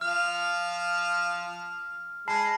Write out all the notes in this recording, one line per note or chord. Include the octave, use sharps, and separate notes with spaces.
F3 F5 F6
G#3 A5 B5 C7